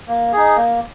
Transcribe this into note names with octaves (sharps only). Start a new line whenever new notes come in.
A#3
D#4 G#4
A#3